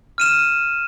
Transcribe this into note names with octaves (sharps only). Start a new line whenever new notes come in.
F6 D#7 E7